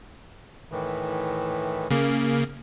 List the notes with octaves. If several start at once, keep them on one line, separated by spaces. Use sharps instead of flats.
A2 D#3 E3
C#3 A#3